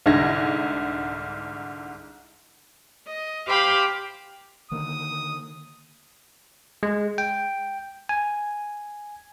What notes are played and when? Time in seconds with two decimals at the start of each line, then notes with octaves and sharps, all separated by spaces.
0.06 C2 G#2 D3 G#6 A#6
3.07 D#5
3.46 G4 C5 F5 G5 B5
4.71 D3 D#3 A#3 D#6
6.83 G#3
7.18 G5
8.09 G#5